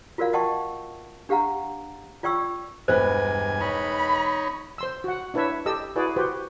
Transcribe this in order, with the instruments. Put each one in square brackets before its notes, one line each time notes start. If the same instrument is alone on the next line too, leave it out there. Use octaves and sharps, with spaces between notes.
[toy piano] F4 F#4 A#4 D5 F5
D#5 F#5 G5 A5 C6 C#6
D4 G4 F5 F#5 A#5
F4 D5 G5 C#6 E6
[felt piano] E1 B3 [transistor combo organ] G2 G#5 [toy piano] C5
[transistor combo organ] D#4 C#5 [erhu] B5
[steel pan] C5 C6 E6
F#4 F#5
D4 E4 B4 C#5 E5
G4 A4 D#5 E6
E4 F#4 G#4 B4 D5
F#4 G4 B4 C5